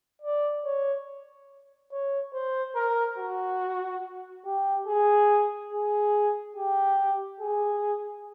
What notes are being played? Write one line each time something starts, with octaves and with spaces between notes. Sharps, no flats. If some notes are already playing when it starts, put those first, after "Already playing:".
D5
C#5
C#5
C5
A#4
F#4
G4
G#4
G#4
G4
G#4